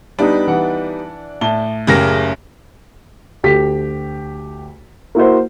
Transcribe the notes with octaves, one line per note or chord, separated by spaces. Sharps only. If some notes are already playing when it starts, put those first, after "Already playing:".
G3 B3 D4 D#4
E3 F#5
A2 A5 G7
F#1 C#3 G4 G#4 A#4 A#6
D2 G4 B6
A#3 E4 F#4 C5